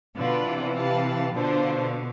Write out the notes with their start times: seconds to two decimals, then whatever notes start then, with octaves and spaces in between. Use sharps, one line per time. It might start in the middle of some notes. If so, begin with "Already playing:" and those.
0.16 B2 D3 B3 D4 F4 B4 D5
0.45 C3 E3
0.74 G4 B4 F5 A5
1.33 B2 D3 D4 F4 C5